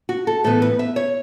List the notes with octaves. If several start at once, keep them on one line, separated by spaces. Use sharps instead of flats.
F#4
A4
A2 E3 B3 A4
B4
E5
C#5